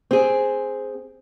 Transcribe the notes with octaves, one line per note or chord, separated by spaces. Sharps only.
C4 G#4